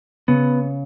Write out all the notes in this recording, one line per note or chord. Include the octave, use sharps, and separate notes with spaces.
C#3 B3